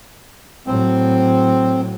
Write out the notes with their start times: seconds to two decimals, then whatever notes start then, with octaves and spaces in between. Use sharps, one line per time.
0.67 A2 F#3 C4